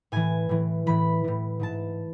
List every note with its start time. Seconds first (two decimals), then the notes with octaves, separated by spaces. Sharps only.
0.12 A2 E3 G#5
0.49 A2 E3
0.86 A2 E3 B5
1.24 A2 E3
1.60 G#2 E3 A5